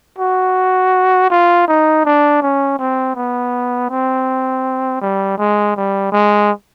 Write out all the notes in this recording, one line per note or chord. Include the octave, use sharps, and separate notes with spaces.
F#4
F4
D#4
D4
C#4
C4
B3
C4
G3
G#3
G3
G#3